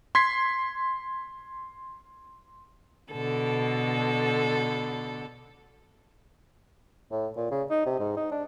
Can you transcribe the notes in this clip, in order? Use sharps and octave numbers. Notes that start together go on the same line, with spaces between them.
C6 G#6 B6 C7
B2 D3 A4
A2
A#2
C#3
D#4
C3
G#2
D#4
D4